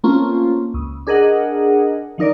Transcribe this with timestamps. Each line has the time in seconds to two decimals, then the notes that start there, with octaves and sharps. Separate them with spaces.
0.04 A3 A#3 C4 C#4 F4
0.74 C#2
1.07 D4 G#4 A#4 D#5 F#5
2.18 D#3 F3 D#4 A#4 D5